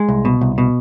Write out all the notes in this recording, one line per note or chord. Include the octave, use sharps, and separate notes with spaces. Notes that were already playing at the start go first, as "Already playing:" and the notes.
Already playing: G#3
C2
B2
C2
B2